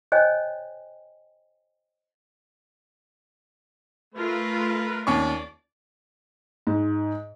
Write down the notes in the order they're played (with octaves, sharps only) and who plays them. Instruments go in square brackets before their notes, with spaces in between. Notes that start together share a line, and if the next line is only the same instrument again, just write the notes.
[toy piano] C5 C#5 D#5 G5 G#5
[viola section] A3 F4 A#4 [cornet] B4
[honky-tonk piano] D#2 C#4 C#6 [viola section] D5
[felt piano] G#2